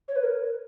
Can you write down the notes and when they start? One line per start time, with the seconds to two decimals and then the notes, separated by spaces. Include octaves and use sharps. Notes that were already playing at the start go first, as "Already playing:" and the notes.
0.08 C#5
0.16 B4
0.23 A#4